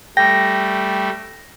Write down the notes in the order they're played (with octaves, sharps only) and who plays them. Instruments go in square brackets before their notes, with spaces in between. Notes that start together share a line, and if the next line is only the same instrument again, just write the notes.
[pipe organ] G3 A3 [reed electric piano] G5 [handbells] A#6